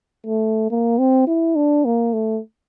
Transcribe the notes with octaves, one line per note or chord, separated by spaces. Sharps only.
A3
A#3
C4
E4
D4
A#3
A3